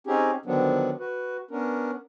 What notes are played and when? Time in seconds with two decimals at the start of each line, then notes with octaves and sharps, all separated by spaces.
0.07 C4 C#4 D#4 G4 G#4
0.46 D3 D#3 F3 F#3 B3 D4
1.00 F#4 B4
1.51 B3 C#4 D4 A#4